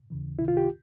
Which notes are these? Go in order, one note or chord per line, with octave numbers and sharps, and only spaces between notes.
D#2 C#3 E3
C#2 C3 D#3 E4
F4
G4